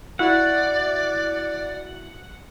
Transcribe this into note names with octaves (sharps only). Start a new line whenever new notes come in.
E4 F#4 D5 E5 F#5